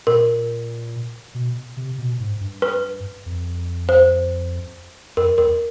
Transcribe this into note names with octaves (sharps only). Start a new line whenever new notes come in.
A#2 A#4
B2
C3
B2
G#2
G2
B4
F2
C5
F2 A#4
E2 A#4